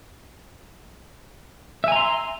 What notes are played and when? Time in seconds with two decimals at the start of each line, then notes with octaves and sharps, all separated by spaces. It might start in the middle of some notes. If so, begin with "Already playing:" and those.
1.84 E5
1.88 G#5
1.92 A#5
1.96 C6